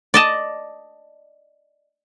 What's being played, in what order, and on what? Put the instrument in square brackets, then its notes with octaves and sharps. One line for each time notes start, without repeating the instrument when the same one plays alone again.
[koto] D5 D#5 A5